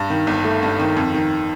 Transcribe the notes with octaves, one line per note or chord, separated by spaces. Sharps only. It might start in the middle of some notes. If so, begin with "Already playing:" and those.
Already playing: G2
D#3
G1
A3
G2
D#3
F2
D#3